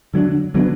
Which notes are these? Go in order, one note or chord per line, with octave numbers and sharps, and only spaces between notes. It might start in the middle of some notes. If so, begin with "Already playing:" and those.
D3 F#3 B3 D4
D3 F#3 B3 D4